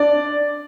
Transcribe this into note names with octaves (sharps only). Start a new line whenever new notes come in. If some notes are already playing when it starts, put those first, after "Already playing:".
Already playing: D4 D5